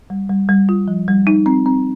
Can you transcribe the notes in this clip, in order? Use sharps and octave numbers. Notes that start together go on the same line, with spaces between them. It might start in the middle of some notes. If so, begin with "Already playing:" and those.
G3
G3
G3
F4
F3
G3
D#4
C4
C4